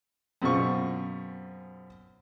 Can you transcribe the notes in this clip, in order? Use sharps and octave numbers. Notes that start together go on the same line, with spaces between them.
F#2 B2 G#3 C4 F4 C#6